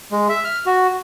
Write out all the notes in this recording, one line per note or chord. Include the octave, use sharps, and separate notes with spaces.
G#3
E5
F6
F#4